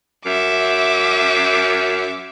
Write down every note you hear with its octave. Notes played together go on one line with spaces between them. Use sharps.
F#2 E5 D6